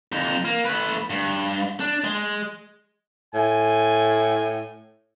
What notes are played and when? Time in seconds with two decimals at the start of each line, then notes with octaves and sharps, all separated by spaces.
0.12 F2 D#4
0.45 A#3
0.65 A3 B4
1.10 G2
1.80 D4
2.04 G#3
3.34 A2 G#5